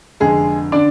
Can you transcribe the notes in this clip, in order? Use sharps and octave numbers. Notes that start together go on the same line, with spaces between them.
F1 F2 D3 G#3 G#4
D3 D4 D5